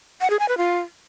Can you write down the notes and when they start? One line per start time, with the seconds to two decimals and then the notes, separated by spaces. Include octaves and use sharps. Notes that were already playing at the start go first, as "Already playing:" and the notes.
0.21 F#5
0.30 G#4
0.39 G#5
0.49 B4
0.58 F4